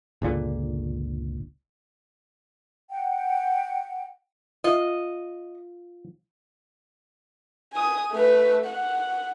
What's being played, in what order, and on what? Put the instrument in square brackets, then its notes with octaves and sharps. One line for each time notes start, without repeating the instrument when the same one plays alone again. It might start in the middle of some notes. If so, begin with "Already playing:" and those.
[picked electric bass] G1 C#2 A#2 D3
[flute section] F#5 G5
[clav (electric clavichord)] F4 [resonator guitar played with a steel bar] D#5
[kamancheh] G#5 D#6
A3 B4
F#5